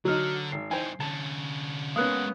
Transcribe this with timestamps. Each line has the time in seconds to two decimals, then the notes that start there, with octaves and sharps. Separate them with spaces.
0.05 D3 F#3 D#4 F#4 F6
0.52 G#1 C7
0.71 E3 D#4 C5 G5 G#5
1.00 D3 C#4 A5
1.96 G#3 A#3 B3 C#4 F#4 D#6 F#6